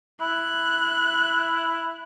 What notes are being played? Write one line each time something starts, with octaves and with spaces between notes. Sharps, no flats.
E4 F#6